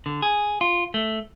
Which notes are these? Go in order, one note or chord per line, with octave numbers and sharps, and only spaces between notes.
D3
G#4
F4
A3